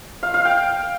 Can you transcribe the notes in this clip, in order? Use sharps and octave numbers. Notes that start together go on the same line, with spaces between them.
F5
F5
G5